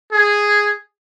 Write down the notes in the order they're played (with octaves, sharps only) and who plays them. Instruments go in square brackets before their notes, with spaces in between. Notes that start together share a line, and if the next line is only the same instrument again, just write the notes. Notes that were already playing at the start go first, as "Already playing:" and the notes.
[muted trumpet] G#4